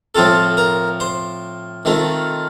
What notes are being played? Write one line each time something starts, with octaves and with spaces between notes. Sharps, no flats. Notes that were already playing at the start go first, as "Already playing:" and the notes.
A2 F3 C4 F4 A4
A#4
C5
D#3 A3 C4 F4